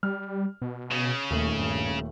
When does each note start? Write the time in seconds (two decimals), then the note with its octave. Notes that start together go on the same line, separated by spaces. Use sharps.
0.03 G3 F6
0.62 B2
0.91 C#3
1.31 D#1 D#2 A3 F#7
1.59 G2